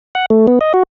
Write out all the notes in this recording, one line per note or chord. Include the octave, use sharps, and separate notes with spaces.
F#5
A3
B3
D#5
F#4